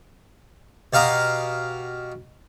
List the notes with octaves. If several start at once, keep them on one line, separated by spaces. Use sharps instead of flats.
B2 G4 F5 A#5 D#6